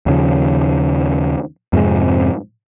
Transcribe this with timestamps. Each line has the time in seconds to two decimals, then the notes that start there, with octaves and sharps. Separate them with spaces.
0.06 D#2 C#3 F3
1.73 F2 G#2 C3 G#3